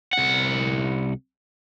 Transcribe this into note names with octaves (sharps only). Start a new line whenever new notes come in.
C2 F#5